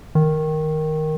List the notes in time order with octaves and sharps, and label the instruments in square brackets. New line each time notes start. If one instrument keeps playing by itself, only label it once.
[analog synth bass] D#3